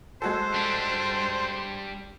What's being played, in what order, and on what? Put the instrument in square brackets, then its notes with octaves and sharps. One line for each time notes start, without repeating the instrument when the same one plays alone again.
[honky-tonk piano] G#3 F#4 A4 [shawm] C5
[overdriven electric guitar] G3 D4